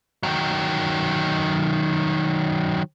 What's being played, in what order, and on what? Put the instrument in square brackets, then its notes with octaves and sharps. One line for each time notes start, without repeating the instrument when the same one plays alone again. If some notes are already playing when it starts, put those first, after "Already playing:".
[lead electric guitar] D#3 F#3